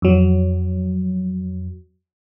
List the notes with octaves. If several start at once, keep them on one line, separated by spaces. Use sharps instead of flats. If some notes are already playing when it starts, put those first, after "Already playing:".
F2 F#3